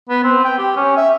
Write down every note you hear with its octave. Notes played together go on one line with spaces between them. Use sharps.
B3
C4
G5
G4
C#4
E5